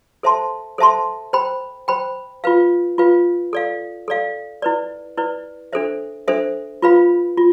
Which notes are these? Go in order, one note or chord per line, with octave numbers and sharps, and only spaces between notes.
A4 C5 E5 A5 C6
A4 C5 E5 A5 C6
C5 G5 B5
C5 G5 B5
F4 B4 F5
F4 B4 F5
A4 D5 F5
A4 D5 F5
E4 B4 D5
E4 B4 D5
D4 A4 C5 E5
D4 A4 C5 E5
F4 B4 F5 B5
F4